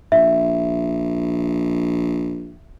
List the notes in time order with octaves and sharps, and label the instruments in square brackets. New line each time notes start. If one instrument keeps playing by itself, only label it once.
[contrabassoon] A#1 [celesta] E5